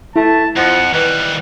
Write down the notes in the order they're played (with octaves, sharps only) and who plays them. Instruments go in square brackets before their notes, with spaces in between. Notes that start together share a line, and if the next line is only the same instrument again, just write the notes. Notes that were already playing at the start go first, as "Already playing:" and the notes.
[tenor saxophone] A3 [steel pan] E4 [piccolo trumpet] A5
[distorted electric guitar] F2 [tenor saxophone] F3 [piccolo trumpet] F#5
[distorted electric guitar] D#2 G3 [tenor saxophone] E3 [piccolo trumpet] F#6